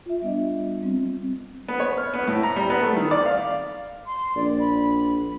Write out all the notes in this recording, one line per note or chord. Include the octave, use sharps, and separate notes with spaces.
F4 E5
G3 B3 D4 D#5
G3 C4
B3
C#5
F6
B3
A2
A#5
G3
B3
A3
D#3
D5
F5
C6
A#1 D5
B5